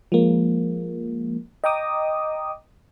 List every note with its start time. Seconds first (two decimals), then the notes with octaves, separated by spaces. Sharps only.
0.12 F3 G#3 A#3
1.64 D#5 G5 A#5 D6 D#6